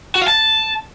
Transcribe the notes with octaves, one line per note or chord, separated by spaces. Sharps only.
F#4
F5
A5